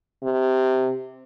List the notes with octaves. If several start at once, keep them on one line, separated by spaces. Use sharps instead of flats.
C3